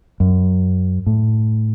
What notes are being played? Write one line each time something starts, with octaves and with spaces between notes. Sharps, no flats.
F#2
A2